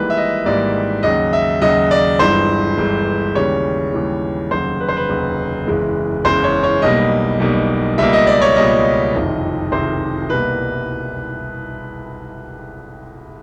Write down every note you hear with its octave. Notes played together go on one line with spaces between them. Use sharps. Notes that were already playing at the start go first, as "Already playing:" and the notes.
Already playing: G#1 G#2 E3 G3 A#3 B4
E5
D#5
G#1 G#2 E3 G3 A#3 D5
D#2 C#3 F#3 D#5
E5
D#2 C#3 F#3 D#5
D5
G1 G2 E3 G#3 C5
G1 G2 E3 G#3
D#2 C#3 E3 G3 C#5
D#2 C#3 E3 G3
F1 D#2 C#3 F#3 C5
B4
C5
B4
F1 D#2 C#3 F#3
F#1 E2 C#3 E3 G#3
F#1 E2 C#3 E3 G#3 C5
C#5
C#5
B1 B2 G3 A#3 D#5
B1 B2 G3 A#3
C#2 B2 G3 A#3 E5
D#5
D5
C#5
C#2 B2 G3 A#3 D#5
F#1 F2 C3 D#3
F#1 F2 C3 D#3 C5
C2 B2 G3 A#3 B4